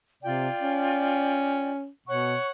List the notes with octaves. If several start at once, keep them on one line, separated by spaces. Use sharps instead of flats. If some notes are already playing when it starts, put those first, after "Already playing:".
C3 F4 D5 G5
C#4
B2 C#5 F#5 C#6